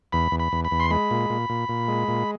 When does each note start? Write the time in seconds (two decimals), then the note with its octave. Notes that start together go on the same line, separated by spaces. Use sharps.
0.12 E2 B5
0.32 E2
0.40 B5
0.53 E2
0.65 B5
0.71 E2
0.80 C6
0.90 G#3 B5
1.11 A#2
1.30 A#2
1.49 A#2
1.69 A#2
1.88 G#3
2.08 A#2